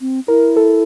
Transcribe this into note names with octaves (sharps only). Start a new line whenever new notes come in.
C4
E4 A#4
A4